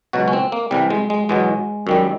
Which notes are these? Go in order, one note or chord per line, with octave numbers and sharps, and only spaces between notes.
C#2 B2 F#3 F#4
C#4
C4
A#3
C2 C3 E3 G3
G#3
G#3
E2 B2 F#3 G#3
F#2 D#3 G3